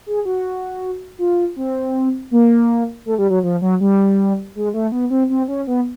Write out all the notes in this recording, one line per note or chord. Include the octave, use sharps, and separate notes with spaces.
G#4
F#4
F4
C4
A#3
A3
G3
F#3
F3
F#3
G3
G#3
A3
B3
C4
C4
C#4
B3